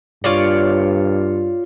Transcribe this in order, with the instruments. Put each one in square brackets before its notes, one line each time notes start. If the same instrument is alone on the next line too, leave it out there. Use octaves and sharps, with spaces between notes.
[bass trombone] G2 [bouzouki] F4 C#5 D5